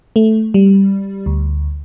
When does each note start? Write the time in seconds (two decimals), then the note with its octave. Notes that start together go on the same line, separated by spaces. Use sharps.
0.16 A3
0.54 G3
1.26 D2